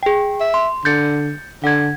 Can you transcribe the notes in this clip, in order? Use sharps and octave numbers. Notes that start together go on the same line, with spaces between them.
G#4 G5
E5
C6
D3 G6 A6 C#7
D3 F#5 G#6